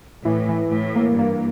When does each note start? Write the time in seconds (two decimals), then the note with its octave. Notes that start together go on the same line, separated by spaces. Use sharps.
0.25 A2 E3
0.49 E3
0.71 A2 E3
0.96 A#3
1.18 G2 A#3